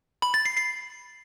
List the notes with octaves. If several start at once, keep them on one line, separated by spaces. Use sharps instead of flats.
B5
A6
C7
C7